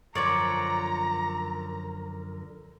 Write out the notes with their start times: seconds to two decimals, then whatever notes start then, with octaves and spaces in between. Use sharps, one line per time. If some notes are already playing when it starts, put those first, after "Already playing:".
0.15 F#2 D3 F3 A#4 C#5 D5 A#5